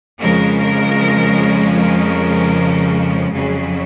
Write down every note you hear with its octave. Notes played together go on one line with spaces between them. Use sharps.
F2 C#3 F3 G#3 A#4
A#4
A#4
F2 C#3 F#3 G#4